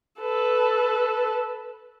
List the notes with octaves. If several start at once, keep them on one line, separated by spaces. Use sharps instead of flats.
A4 B4